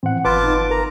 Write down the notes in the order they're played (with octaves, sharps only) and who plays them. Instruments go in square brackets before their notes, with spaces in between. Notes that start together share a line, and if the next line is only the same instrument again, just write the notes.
[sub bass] A2 [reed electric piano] E3 [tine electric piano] C4 F#5
[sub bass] G1 [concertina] F4 A5 D6 [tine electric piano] B4
[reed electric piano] D#4
[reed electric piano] A#4 [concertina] A#5